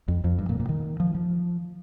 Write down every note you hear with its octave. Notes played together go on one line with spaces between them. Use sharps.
F2
F2
G2
A#2
A#2
D#3
F3
F3